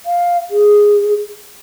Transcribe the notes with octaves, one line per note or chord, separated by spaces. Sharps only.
F5
G#4